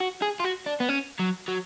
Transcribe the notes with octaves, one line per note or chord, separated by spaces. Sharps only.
F#4
G#4
F4
F#4
D4
B3
C#4
F#3
F#3